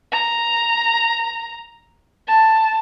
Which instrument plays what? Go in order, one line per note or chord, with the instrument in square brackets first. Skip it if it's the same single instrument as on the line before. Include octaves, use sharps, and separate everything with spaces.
[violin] A#5
A5